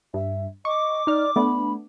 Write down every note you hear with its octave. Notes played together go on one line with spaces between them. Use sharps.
G2 E5
D#5 C#6 D6
D#4 D5 F6
A3 B3 D4 B5